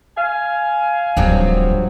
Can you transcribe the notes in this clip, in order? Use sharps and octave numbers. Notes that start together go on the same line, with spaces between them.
F5 G#5
D1 G2 F3 F#3